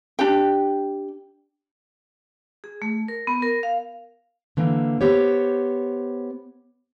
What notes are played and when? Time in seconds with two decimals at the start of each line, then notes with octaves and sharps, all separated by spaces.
0.19 D4 G4 G5
2.64 G#4
2.82 A3
3.08 A#4
3.27 B3
3.42 A#4
3.63 F5
4.57 D3 E3 A#3
5.01 B3 G4 C5 C#5